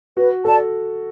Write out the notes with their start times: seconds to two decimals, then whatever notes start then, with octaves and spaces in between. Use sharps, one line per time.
0.17 F#4 B4
0.45 A4 D5 A5